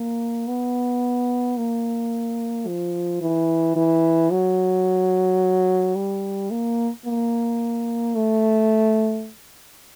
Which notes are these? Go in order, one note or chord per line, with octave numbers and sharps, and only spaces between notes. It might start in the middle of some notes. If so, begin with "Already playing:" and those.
Already playing: A#3
B3
A#3
F3
E3
E3
F#3
G3
A#3
A#3
A3